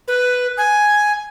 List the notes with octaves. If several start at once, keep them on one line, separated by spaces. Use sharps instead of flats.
B4
G#5